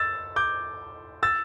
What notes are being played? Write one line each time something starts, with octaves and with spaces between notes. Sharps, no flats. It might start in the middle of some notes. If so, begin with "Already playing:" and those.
Already playing: E6 A6
D6 G6
E6 A6